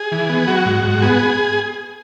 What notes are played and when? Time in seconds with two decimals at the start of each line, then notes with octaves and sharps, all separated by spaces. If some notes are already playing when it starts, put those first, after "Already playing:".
Already playing: G#4
0.12 E3
0.30 B3
0.48 F#3 F#4
0.66 G#2
0.84 G#2
1.02 B3 G#4